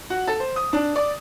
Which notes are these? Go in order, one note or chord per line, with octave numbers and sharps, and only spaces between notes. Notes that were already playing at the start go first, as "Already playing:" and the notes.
F#4
A4
C5
D#6
D4
D5